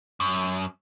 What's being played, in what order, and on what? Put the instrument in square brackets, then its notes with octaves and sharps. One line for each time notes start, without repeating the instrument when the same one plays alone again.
[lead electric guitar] F#2